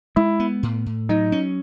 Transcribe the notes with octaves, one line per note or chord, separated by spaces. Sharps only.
G#3 E4
B3
A2
A2
F#3 D#4
C#4